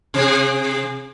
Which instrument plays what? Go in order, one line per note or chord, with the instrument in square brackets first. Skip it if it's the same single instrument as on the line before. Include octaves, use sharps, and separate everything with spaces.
[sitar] C3 G#4